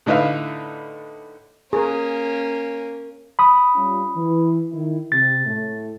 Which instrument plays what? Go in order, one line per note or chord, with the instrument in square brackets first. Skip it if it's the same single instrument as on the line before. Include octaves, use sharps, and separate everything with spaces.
[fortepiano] A2 D3 D#4 B4 E5 F5
[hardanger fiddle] A#3 C#4 [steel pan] G#4 A#4
[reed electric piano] B5 D#6
[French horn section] G3 C#4 F4
E3
D#3 E4
[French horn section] C3 [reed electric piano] A6
[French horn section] A2 A3